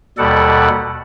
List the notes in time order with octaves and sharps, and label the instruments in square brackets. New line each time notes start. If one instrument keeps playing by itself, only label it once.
[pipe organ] D#2 B2 G3 A4 D5 F#5